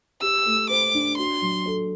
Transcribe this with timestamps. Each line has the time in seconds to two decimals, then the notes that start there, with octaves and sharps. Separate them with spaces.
0.21 G4 E6
0.45 A3
0.69 C5 D6
0.94 D4
1.17 F#4 C6
1.42 F#3
1.66 A4